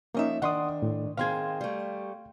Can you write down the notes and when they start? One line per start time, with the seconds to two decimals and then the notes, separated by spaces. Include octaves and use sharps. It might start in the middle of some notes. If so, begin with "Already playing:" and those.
0.14 F3 A#3 C#4 D#4 D#5 E5
0.42 D#3 D4 F#5 C6 D#6
0.82 A2
1.17 D#3 C4 G#4 F5 C6 G#6
1.61 G3 A3